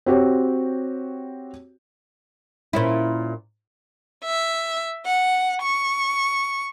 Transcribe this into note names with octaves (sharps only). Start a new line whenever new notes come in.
C4 F#4 G4 C#5
A#2 C#4 E4
E5
F#5
C#6